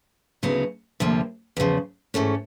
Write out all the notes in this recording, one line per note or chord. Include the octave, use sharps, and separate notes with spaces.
D2 C#3 F#3 B3 D#4
D2 C3 F3 A#3
E2 C#3 F3
G#2 E3 A3 C#4